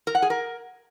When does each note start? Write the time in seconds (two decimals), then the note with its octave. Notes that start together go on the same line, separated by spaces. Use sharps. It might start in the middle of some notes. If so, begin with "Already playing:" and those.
0.07 A#4
0.15 F#5
0.22 G#4
0.30 A#4